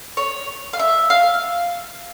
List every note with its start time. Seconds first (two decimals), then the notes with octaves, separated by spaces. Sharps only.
0.17 C#5
0.73 F5
0.79 E5
1.10 F5